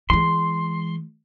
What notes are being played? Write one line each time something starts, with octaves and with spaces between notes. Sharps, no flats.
E3 G#3 C6